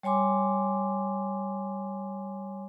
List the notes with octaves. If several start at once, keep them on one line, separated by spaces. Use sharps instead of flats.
G3 C#5 G#5 C6 D6